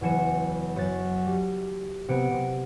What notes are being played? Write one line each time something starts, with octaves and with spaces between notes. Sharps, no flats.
F#1 E2 G#5 C#7 E7
F#2 A6
G3
C3 B3 C#7 D7
C3